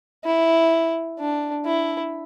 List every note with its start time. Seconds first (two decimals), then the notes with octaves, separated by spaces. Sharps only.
0.25 E4
1.20 D4
1.66 E4